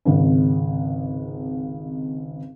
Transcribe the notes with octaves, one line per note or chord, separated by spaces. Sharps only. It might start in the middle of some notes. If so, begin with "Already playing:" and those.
G#1 C#2 C3